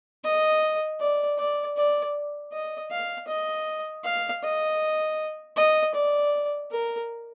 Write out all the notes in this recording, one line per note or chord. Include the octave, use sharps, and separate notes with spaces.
D#5
D5
D5
D5
D#5
F5
D#5
F5
D#5
D#5
D5
A#4